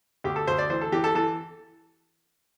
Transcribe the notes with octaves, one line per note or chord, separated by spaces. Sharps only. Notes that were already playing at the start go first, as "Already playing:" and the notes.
D2 G4
A4
D2 C5
D5
E3 C5
A4
E3 G4
A4
E3 A4